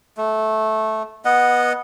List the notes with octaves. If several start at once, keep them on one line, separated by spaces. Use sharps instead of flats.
A3
B3 D#5 F#5